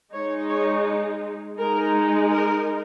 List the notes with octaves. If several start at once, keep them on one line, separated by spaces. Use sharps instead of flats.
G#3 D#4 C#5
C#5
G#3 D#4 A#4
A#4